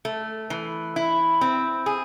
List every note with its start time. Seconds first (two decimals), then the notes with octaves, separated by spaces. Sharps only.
0.05 A3
0.50 E3
0.96 E4
1.41 C4
1.86 G#4